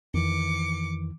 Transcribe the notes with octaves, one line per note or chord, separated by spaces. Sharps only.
F2 D#3 E3 D6 C#7